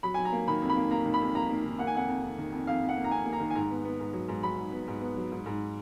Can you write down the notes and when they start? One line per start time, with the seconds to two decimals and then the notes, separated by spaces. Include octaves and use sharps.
0.03 F#3 B5
0.14 F#3 G#5
0.25 A#5
0.32 A#3
0.48 D#3 B5
0.62 F2
0.69 B5
0.76 A#3
0.91 A#3 A#5
1.05 D#3
1.14 B5
1.21 F2
1.35 A#3 A#5
1.51 A#3
1.65 D#3
1.79 A#3 F#5
1.87 G#5
1.95 F2 F#5
2.08 F2
2.23 F2
2.38 D#3
2.52 F2
2.67 F2 F5
2.83 F2
2.89 F#5
2.97 A#3
3.04 A#5
3.11 F2 G#5
3.25 A#3
3.33 A#5
3.40 D#3
3.50 G#5
3.55 G#2 A#5
3.70 B3
3.85 B3
4.00 G#2
4.13 F#3
4.28 G#2
4.43 F#3 B5
4.58 G#2
4.72 B3
4.88 G#2
5.01 B3
5.17 F#3
5.32 G#2
5.46 G#2